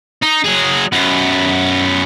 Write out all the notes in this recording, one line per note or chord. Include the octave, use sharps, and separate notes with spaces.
D#4
F#3 G#4
F#2 B3